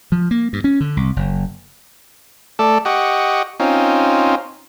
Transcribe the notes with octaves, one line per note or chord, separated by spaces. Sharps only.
F3
A#3
G2
C#4
D3
C2
F#1
A3 A4 D5
G4 D#5 F#5 C#6
C4 C#4 D#4 F4